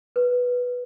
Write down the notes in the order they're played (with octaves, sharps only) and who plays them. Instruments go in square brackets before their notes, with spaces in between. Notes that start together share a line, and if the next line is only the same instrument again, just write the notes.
[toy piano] B4